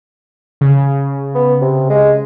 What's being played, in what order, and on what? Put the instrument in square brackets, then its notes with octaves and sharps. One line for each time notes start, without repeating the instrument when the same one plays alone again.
[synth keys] C#3
[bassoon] B3
C3
G#3